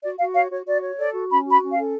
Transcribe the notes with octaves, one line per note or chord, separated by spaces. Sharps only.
F#4 D5
F#4 F5
C#5 F5
F#4 C#5
F#4 D5
C#5
A4 D5
F#4
C#4 B5
F#4
B5
C#4
F5
A4